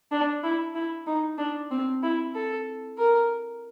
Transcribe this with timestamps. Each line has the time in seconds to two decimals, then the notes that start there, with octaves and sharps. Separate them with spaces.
0.11 D4
0.43 E4
0.75 E4
1.07 D#4
1.38 D4
1.71 C4
2.03 E4
2.35 A4
2.98 A#4